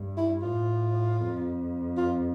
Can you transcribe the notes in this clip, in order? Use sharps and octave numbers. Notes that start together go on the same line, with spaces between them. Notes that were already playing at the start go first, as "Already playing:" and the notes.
Already playing: G2
E4
A2 F4
F2
F4